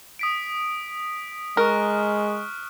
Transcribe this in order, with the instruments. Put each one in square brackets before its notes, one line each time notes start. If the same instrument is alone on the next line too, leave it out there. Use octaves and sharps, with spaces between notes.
[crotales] D#6 B6 D7
[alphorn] G#3 [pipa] A#4 [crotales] C#6 F6 F#6